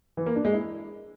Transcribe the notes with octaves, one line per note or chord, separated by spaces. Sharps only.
E3
A#3
D4
G#3
E4